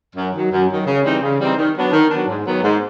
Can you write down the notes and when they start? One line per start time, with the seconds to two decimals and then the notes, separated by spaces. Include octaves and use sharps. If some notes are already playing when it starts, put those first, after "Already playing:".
0.16 F#2
0.34 D#3 F#3
0.51 F#2
0.69 D#3 F#3
0.87 C#3
1.04 E3 G3 C4 D#4
1.22 C#3
1.39 E3 G3 C4 D#4
1.57 D#3
1.75 F#3 B3 D4
1.93 D#3
2.11 F#3 B3 D4
2.28 G#2
2.46 D#3 F#3 B3
2.63 G#2